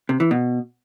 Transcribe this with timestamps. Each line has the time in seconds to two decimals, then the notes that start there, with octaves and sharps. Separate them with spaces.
0.09 C3
0.20 E3
0.31 B2